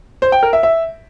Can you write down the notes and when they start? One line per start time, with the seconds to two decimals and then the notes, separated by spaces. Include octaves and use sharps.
0.22 C5
0.32 G5
0.43 A#4
0.53 E5
0.63 E5